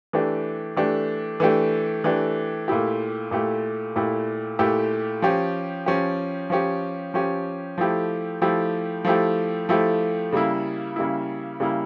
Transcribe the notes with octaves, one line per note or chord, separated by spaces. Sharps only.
E3 A3 D4 G4
E3 A3 D4 G4
E3 A3 D4 G4
E3 A3 D4 G4
A#2 A3 E4 G4
A#2 A3 E4 G4
A#2 A3 E4 G4
A#2 A3 E4 G4
F3 C#4 G4
F3 C#4 G4
F3 C#4 G4
F3 C#4 G4
F3 A3 E4 G4
F3 A3 E4 G4
F3 A3 E4 G4
F3 A3 E4 G4
C#3 G3 A#3 E4
C#3 G3 A#3 E4
C#3 G3 A#3 E4